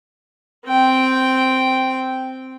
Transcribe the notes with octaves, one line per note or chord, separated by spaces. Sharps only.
C4 G5